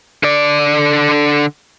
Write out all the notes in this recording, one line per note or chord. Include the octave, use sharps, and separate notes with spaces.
D3 D5